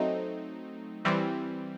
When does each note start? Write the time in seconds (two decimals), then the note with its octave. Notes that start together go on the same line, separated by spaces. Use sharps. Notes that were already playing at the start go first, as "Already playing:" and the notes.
Already playing: F#3 A3 C4 D#4
1.05 E3 G3 C4